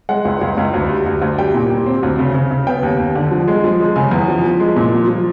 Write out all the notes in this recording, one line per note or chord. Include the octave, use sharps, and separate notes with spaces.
G#3 F#5
C#2
C#2
C#2
D2
G3
D2
D2
G3 G5
A#2
G3
C4
D2
C#3
C#3
C#3
B3 G5
D#2
D#2
D3
F3
G#3
F3
G#3
C#3 G#5
E2
F3
F3
G#3
A#2
F3
F3